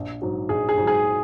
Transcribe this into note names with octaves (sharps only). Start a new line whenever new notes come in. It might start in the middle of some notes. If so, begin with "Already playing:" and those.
Already playing: A#1
G#2 F#3
A#1 G#4
G#4
G#2 F#3
G#4